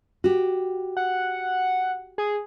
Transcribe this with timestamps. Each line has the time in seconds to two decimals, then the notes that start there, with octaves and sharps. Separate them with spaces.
0.24 F#4 G4
0.97 F#5
2.18 G#4